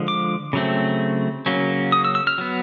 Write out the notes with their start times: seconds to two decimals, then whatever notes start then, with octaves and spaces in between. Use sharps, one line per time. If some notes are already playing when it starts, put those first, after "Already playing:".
Already playing: D3 F3 G#3
0.08 D6
0.53 C#3 F#3 A3 C4
1.46 C#3 F#3 A#3 C#4
1.92 D#6
2.05 E6
2.15 E6
2.27 F6
2.38 F#3 B3